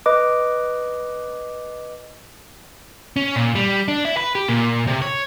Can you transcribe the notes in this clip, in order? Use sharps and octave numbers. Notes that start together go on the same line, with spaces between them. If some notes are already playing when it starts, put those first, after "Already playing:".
B4 D#5 D6
C#4
A#2
G3
D4
E4
B4
G4
A#2
C3
C#5